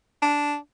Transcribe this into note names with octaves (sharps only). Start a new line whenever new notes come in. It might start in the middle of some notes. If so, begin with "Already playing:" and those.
D4